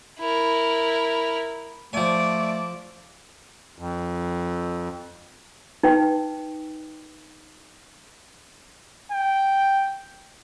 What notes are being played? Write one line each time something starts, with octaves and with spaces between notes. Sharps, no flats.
E4 A#4
F3 A3 D5 G#5
F2
D#4 B4 G5
G5